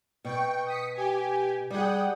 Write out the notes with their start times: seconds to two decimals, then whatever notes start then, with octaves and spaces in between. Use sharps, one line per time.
0.25 B2 G5 C#6
0.66 D#6 B6 C#7
0.95 G4 G#5
1.70 G3 G#4 F#5 G5 D#6